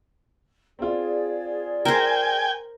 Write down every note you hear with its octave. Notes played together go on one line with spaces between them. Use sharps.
C4 F4 G#4 D5
A#4 C5 G5 G#5